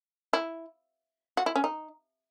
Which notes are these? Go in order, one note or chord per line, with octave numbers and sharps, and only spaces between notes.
E4
F#4
E4
C#4
D#4